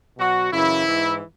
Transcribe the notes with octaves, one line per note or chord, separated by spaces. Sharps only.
B2 F#3 F#4
F#2 C#3 E3 E4
G#2 E3